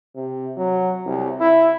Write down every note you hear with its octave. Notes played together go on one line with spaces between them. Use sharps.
C3
F#3
C2
E4